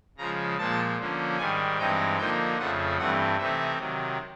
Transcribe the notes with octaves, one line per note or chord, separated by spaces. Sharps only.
C#3 F3 G#3 A#5
A#2 F3 G#3 A5
D3 F3 A#3 C#4
G#2 D#3 G3 G#5
G2 E3 G#3 C4 D#4 G5
D3 F3 A#3 D#4 G5
F2 C#3 F3 A3 F#5
G2 E3 A3 C4 F#5
C3 E3 A3 C4 D#4 E5
C3 D#3 F#3